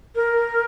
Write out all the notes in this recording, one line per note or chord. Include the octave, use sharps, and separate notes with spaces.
A#4